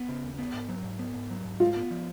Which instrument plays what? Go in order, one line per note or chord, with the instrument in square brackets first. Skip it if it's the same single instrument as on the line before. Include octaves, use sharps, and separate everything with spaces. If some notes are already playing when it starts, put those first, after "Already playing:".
Already playing: [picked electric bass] B3
C#3
D#2
B3
G#2
F#3
G#2
B3
G#2
F#3
G#2
[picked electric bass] G#3 [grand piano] F4
[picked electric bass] B3
F3